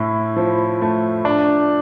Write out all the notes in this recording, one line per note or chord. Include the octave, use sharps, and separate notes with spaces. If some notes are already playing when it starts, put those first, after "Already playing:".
Already playing: A2 E4
F3
A3
D4